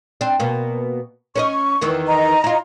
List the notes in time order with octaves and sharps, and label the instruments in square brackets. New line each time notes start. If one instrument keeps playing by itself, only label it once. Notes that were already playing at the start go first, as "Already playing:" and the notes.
[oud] C4 D4
B2 A#3
[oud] C#4 B4 D#5 [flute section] C#6
[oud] E2 D#3 E3
[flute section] D#5 A#5
[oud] E4 F4